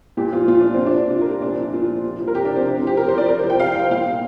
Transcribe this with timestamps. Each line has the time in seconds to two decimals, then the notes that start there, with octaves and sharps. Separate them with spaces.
0.17 A#2 G4
0.33 F3 F4
0.48 A#2 F4
0.60 F3 D4
0.74 C3 C4
0.86 D4
0.95 G3
1.10 C3 F4
1.21 A#4
1.26 G3
1.42 A#2 D4
1.57 F3
1.72 A#2 F4
1.88 F3
2.04 C3
2.20 F3
2.28 A#4
2.35 C3 G4
2.45 D4
2.51 F3 C4
2.66 C3
2.77 C4
2.82 F3 G4
2.97 C3 A#4
3.08 C5
3.13 F3 D5
3.28 C3 A#4
3.39 C5
3.44 F3
3.50 G5
3.60 C3 F5
3.75 F3 G5
3.91 A#2 F5
4.07 G3